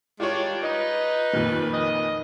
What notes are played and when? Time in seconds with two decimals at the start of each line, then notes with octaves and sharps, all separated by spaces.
0.20 D#3 G3 G#3 D4 F4 C#5
0.63 D#4 B4
1.33 F2 A#2 D#3
1.74 D#5